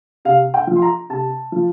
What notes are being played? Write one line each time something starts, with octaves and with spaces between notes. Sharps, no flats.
C3 F5
G5
F3
C6
A#5
C3 A5
F3